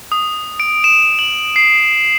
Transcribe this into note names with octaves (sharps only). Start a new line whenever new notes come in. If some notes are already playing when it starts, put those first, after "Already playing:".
D#6
D7
E7
F#7
C7